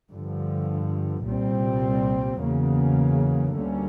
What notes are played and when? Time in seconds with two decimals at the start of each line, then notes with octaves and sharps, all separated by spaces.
0.11 G2 D3 F3
1.26 C2 A#2 G3 C4
2.41 E2 C#3 F#3 A#3
3.55 D2 D3 G3 A#3 C#4